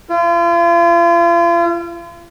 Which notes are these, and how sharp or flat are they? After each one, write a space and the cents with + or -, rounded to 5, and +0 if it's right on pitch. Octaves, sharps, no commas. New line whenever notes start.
F4 -40